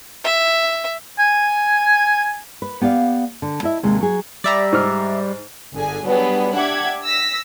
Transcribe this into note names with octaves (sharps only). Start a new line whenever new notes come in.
E5
G#5
B4
B3 G4 D5 F5
D3
E4 D#5 E5
D#2 C3 G#3
F#3 G#4
G3 D5 E5 A#5
G#2 F6
G1 D3 G#4 G#5
F#3 G3 B3 D4 G4 G#4
D4 G4 E5 F#5 D6 G#6
E6 A#6 B6